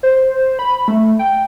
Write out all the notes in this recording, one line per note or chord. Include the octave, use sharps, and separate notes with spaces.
C5
B5
A3
G5